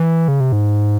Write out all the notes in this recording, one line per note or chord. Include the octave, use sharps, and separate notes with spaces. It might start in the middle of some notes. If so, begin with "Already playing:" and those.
Already playing: E3
C#3
C3
G#2